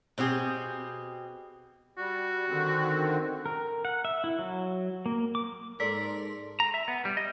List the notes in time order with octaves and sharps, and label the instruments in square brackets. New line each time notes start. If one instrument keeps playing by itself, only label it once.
[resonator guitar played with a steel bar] B2 C4 G4 G#4
[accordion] G3 [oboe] F#4
[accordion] D3 D#3 C4
[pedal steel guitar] A#4
F#5
E5
E4
F#3
A#3
D6
[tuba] G#2 [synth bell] A4 D5 C6 [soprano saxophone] A#4 [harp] B6
[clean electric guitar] A#5
E5
B3
G3
D#5